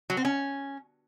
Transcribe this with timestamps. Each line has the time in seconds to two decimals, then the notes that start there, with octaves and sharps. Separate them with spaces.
0.10 F#3
0.17 C4
0.25 C#4